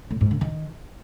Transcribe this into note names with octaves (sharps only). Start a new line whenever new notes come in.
A2
G#2
D3
D#3